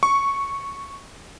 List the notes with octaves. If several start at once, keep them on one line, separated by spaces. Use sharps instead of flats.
C#6